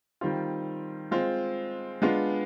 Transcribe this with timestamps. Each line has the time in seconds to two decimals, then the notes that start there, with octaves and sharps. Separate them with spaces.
0.21 D#3 G3 C4 F4
1.11 G#3 C4 F4
2.02 G#3 B3 D4 F4